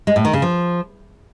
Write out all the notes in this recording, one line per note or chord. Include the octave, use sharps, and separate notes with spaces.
G#3
A2
D#3
C#3
F3